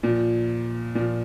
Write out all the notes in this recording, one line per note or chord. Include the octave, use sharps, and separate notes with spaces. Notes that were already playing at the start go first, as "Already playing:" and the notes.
A#2 F3
A#2 F3